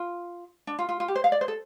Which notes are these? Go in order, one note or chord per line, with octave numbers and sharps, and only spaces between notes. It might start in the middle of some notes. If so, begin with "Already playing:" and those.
Already playing: F4
D4
F4
F4
F4
G4
C5
F5
D5
C5
A4